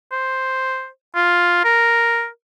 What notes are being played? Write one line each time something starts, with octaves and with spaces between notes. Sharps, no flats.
C5
F4
A#4